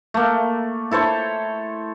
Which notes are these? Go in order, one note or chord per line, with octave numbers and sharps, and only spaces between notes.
A3 A#3
E4 A4 C5 C#5